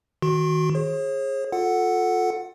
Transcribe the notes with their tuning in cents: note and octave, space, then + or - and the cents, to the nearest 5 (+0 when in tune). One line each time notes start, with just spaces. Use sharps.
D#3 +20 F#4 +0 C6 +45
G#4 +0 C#5 -45
F4 +30 A4 +0 F#5 +0